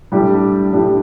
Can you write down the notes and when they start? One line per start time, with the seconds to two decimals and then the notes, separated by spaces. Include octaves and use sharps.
0.12 A2 G3 D4 G4
0.73 A2 G3 D4 G4